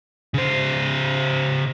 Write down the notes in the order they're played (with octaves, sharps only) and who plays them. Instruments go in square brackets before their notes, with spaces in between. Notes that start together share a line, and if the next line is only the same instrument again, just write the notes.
[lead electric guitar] C#3 C5